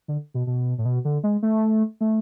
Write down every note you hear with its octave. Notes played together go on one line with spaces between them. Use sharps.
D3
B2
B2
A2
B2
D3
G#3
A3
A3